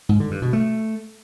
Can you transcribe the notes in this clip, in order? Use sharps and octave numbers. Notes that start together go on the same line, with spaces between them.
G#2
D3
G2
B2
A3